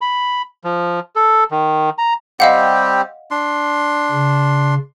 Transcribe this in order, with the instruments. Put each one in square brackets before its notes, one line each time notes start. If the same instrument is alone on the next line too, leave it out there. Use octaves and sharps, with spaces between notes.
[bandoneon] B5
F3
A4
D#3
A#5
[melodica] G3 C4 G4 [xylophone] D#5 F5 F#5
[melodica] D4 C6
[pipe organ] C#3